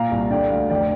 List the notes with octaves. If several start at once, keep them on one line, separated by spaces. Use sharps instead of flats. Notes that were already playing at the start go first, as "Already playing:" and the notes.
Already playing: A#2 F5 A#5
C2
D3 D5 G5
D2 F5
F1 D5 G5